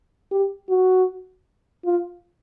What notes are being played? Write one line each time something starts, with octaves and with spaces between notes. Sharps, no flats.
G4
F#4
F4